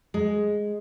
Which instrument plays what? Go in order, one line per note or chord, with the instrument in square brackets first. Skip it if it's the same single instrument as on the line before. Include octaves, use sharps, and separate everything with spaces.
[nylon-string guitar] G#3